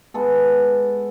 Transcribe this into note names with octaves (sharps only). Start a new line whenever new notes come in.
G#3 B3 A4